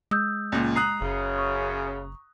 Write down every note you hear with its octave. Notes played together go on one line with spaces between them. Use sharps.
G#3 D#6 E6 G6
C#2 A#2
A#5 D#6 F#6 C7
F#1 F#2 C#3
C#6